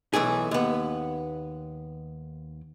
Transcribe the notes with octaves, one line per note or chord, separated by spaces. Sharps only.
B1 E3 A3 G#4
D#2 B3